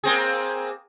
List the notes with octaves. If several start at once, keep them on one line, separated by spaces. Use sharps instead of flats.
A#3 C4 G#4